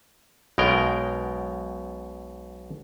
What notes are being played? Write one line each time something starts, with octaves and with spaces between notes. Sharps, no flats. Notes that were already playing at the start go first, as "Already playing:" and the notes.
B1 B2 G#3 A#4 G5